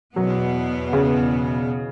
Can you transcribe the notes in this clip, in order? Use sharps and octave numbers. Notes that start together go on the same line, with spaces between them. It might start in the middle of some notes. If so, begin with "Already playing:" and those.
E2 B2 F#3 B3
C#3